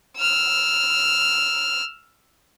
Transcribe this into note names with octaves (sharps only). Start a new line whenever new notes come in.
E6 F6